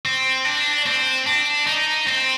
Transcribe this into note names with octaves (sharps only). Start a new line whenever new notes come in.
C4
D4
C4
D4
D#4
C4